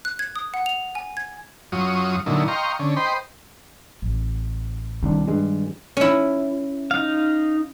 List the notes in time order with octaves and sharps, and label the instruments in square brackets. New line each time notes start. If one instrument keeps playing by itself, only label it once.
[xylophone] F#6
G#6
D#6
F#5
F7
G#5
G#6
[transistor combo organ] F#2 F#3 F4 C#6 D#6
A#2 D3 F#3 D#4 E4
D#5 F5 G5 A#5 C6 C#6
D3 C#4
C5 D#5 G5 B5 C6
[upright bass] A1
[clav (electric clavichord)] C2 D4 [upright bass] D#3
[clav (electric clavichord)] G2 G#3
[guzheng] C#4 E4
[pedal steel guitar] D#4 F5